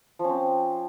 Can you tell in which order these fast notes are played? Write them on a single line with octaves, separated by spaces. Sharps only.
F3 C#4 C4